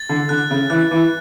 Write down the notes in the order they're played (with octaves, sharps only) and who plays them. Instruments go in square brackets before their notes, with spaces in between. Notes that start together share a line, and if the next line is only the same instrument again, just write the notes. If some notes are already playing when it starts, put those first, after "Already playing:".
Already playing: [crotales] A6
[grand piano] D3
[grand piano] D3 [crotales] F#6
[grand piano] C#3
[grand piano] E3 [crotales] F#6
[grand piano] E3